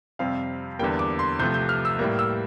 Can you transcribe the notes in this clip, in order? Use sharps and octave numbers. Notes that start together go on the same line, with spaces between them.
F2 C3 G3 F5
E2 D3 G3 A#3 G5
D6
C6
C2 C3 F3 A3 G6
G6
F6
E6
A2 G3 A#3
E6